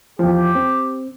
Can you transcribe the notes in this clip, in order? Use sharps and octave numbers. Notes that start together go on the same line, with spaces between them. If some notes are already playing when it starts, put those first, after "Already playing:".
E2 F3 G4
C4